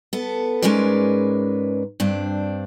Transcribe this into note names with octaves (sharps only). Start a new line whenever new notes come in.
B3 A4
G#2 G#3 C#4 A#4 B4 D5
G2 C4 D4